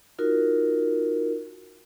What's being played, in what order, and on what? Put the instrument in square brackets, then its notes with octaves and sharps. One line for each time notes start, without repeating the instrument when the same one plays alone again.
[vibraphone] D#4 F4 F#4 A#4